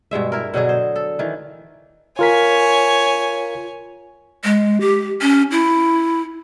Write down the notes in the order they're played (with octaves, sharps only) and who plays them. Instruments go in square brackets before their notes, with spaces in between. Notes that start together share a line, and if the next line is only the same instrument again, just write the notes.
[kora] G2 B2 G#3 E5
E4 A#4
B2 D3 F#3 G#4
C5
A4
D#3 E3
[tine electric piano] F4 A#4 B6 [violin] C#5 G#5
[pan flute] G#3
G4
C#4
E4